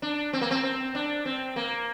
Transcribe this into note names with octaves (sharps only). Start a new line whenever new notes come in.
D4
C4
A#3
C4
C4
D4
C4
A#3